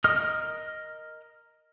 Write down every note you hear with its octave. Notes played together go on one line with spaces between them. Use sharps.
A#4 D#5 D#6 F6